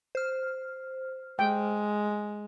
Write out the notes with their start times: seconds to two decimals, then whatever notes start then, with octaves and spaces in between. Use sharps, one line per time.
0.15 C5 F6
1.39 G#3 G5